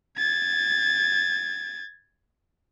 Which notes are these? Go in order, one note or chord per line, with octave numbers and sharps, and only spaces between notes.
G#6 A6